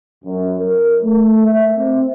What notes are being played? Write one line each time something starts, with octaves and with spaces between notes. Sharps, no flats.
F#2
A#4
A3
E5
C4